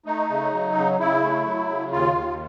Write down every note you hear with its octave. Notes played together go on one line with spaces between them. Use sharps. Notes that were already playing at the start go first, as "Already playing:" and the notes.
A3 D#4
C#3
F#3
C#3
C#3 E4
A3
F#3
C#3
D#2 F4
D#2